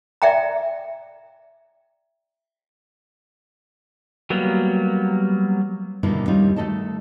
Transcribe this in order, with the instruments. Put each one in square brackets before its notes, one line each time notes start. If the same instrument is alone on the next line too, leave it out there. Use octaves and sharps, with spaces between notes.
[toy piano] D5 E5 G5 A#5
[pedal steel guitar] F#3 G3 A#3 B3
[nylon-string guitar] G2 B2 D3 D#3 A#3 E4
D#2 G3 A#3 C#4 D#4 F4
D#3 A3 A4 D#5 A5